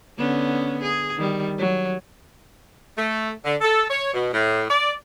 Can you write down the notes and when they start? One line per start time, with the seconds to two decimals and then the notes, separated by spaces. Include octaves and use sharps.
0.18 D3 B3 C#4
0.82 G#4
1.17 D#3 G3
1.58 F#3
2.98 A3
3.45 D3
3.62 A4
3.90 C#5
4.13 B2
4.34 A2
4.69 D5